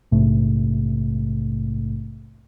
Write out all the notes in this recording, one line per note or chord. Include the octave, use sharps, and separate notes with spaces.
A#1 G#2 C3 A3